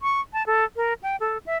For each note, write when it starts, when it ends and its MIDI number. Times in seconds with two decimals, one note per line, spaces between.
0.02 0.21 85
0.33 0.46 81
0.46 0.64 69
0.76 0.93 70
1.03 1.16 79
1.20 1.38 69
1.46 1.57 76